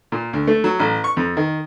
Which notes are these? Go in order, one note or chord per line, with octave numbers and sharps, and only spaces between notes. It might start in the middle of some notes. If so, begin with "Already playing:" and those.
A#2
D2
A3
F#3
A1
C#6
F2
D#3